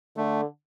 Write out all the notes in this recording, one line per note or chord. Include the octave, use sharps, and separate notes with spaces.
D3 A3